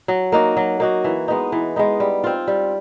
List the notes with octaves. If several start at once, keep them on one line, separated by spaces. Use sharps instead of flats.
F#3
A#3 D#4 F#4
F#3
A#3 D#4 F#4
E3
G#3 B3 D#4
E3
G#3 B3 D#4
G3
C4 F4
G3